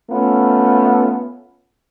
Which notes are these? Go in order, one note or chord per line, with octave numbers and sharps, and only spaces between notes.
A3 B3 C#4 F4